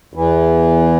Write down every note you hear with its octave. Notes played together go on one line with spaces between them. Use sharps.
E2 E3